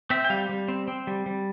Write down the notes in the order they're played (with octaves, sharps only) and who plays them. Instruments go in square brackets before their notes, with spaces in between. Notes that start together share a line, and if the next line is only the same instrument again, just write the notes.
[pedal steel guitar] C4 E5
G5
G3 F5
G3
C4
C4
G3
G3